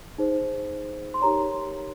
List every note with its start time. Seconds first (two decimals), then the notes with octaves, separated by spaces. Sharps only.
0.18 D#4 G#4 C5
1.14 C6
1.22 D#4 G4 A#4 C#5 A#5